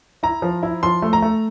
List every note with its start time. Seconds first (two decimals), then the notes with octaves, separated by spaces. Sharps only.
0.23 E4 A#5
0.42 F3
0.63 E4
0.83 F3 C6
1.02 A3
1.13 A#5
1.22 A3